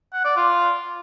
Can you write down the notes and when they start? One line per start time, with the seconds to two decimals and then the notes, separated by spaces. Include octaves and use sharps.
0.13 F#5
0.25 D5
0.36 F4